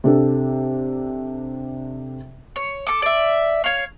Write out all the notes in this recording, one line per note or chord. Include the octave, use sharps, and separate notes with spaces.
C3 D4 A4
C#5
A4 D6
D5 E5
C#5 F5